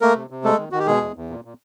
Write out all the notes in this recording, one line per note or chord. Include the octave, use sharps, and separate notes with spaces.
A3 A#3 A#4
C3
C3
G#3 A3 A4
D#3
D#3 F#4
G4
B2 G#3 G#4
E2
E2
A#2
A#2